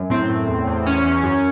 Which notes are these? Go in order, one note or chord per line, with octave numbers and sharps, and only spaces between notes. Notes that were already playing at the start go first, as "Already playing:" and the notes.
Already playing: F#2
A2 C4
A2
E2
E2
E2 C#4
E2
F#2